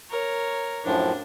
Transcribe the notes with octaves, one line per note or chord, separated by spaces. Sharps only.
A#4 C#5
F#2 A2 F3 D4